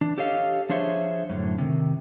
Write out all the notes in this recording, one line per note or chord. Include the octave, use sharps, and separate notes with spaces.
E3 D4
G4 A4 C#5 D#5 F5
F3 D4 G#4 C5 C#5 E5
F#2 A2 D3
C3 D#3